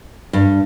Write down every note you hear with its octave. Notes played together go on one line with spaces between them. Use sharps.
G2